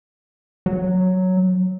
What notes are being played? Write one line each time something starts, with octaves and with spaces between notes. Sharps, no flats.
F#3